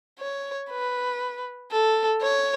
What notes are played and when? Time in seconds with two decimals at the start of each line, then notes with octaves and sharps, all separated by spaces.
0.19 C#5
0.70 B4
1.71 A4
2.22 C#5